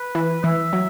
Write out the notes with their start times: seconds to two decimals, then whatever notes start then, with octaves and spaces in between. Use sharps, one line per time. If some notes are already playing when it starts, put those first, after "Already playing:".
Already playing: B4
0.15 E3
0.44 E3 E5
0.73 F#3